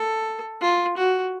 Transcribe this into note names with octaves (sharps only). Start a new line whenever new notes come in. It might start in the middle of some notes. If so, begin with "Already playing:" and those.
Already playing: A4
F4
F#4